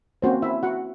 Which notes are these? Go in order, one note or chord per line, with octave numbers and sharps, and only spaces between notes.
A#3 C4 C#4 F#4 C5
E4 E5
F#4 F#5